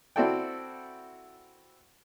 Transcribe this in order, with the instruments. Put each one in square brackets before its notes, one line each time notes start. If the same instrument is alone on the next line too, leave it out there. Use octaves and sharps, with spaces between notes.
[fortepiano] C4 E4 F#4 A4 D5 G5